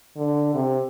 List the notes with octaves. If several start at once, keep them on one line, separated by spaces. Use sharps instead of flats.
D3
C3